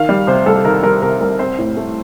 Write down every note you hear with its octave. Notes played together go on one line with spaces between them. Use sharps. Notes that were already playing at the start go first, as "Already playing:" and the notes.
Already playing: D#3 F5
G3
C3 C5
C2 A4
D#3 A#4
G3 A#4
C3 A#4
C2 A#4
C4 C5
A2
A3